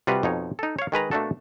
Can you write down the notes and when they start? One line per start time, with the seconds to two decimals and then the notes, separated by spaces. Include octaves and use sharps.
0.07 C3 G3 F4 F#4 B4
0.23 F2 B2 D#4 C#5
0.59 D#4 A4
0.79 C#5 F5
0.92 D#3 G#3 B4 A#5
1.11 B2 A3 A#3 D4 F#4 A4